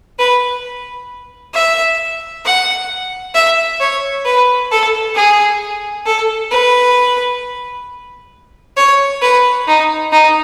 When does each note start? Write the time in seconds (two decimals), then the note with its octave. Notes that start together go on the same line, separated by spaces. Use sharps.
0.19 B4
1.54 E5
2.45 F#5
3.35 E5
3.80 C#5
4.25 B4
4.71 A4
5.15 G#4
6.06 A4
6.51 B4
8.77 C#5
9.22 B4
9.67 D#4
10.12 D#4